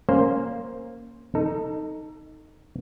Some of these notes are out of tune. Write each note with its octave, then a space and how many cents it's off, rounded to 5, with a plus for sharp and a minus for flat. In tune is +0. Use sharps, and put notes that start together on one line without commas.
A#3 +0 C#4 +0 C5 +0
D#4 +0 A4 +20